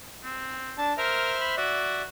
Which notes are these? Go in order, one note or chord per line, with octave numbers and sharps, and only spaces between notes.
C4
D4 A5
A#4 C5 E5 F6
B5
F#4 D5 E5